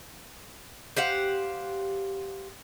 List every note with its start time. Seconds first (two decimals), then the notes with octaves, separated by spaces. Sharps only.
0.97 G4 C5 F5 F#5